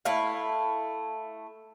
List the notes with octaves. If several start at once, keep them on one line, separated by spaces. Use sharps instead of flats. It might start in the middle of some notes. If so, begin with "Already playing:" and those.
A3 E4 F5